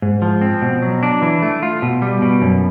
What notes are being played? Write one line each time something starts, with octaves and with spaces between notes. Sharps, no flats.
G#2
F3
C4
B2
F#3
D4
E3
A3
F4
B2
G3
B2
F#2